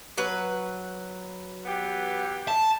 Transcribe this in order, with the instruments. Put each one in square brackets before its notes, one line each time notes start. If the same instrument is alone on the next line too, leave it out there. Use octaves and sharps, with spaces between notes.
[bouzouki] F#3 B4
[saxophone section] E3 B3 G4
[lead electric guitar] A5